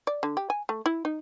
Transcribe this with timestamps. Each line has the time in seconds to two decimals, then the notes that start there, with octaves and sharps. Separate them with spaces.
0.07 D5
0.23 D3
0.37 G4
0.50 G#5
0.69 A3
0.86 E4
1.05 D#4